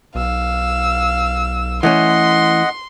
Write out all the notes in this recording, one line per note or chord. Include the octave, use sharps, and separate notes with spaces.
B1 F5 E6
E3 A3 C#4 D#5 F#5 C6